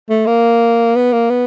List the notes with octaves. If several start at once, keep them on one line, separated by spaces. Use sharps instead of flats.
A3
A#3
B3
A#3
B3